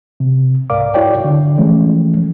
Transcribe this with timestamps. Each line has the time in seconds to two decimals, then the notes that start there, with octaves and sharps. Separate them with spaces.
0.20 C3
0.70 C2 G#2 A#4 D5 F5 D6
0.94 E4 F#4 C#5 D5 G5
1.24 D3
1.58 E3 F3 G#3 A3 C#4